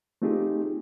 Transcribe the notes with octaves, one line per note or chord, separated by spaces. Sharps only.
A3 C4 D#4 F4 G4 G#4